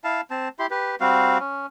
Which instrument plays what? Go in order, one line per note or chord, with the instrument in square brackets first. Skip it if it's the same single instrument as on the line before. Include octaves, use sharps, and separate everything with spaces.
[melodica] E4 F5 A5
C4 A5
E4 G4 C6
G4 B4
G3 C4 F#4 F5
C#4